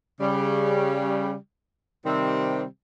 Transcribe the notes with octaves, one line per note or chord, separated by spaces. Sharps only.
C#3 G3
C3 D#3 G3 C4